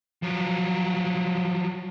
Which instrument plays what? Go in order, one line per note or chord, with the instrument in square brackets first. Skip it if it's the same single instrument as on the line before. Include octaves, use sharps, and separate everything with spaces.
[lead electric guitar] F3 F#3